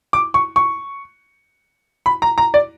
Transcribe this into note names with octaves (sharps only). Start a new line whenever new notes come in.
D6
C#6
C#6
B5
A#5
A#5
D5